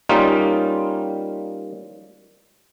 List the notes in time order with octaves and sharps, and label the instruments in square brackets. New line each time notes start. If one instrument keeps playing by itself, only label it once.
[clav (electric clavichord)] G3 A#3 C#4 D#4 F4